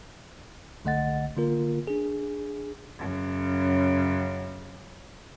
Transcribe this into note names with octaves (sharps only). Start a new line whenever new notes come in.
B1 D3 A3 D#5 F#5 A6
D3 A#3 F4 A#4
D4 G#4
F#2 C#3